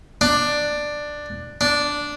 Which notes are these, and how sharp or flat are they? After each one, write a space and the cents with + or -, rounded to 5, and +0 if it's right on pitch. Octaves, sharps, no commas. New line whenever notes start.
D4 +10
D4 -5